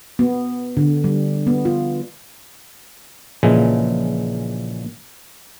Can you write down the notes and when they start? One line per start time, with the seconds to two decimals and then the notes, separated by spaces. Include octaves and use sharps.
0.19 B3
0.77 D3
1.04 G3
1.47 B3
1.65 F4
3.43 A#1 A#2 C#3 E3 G#3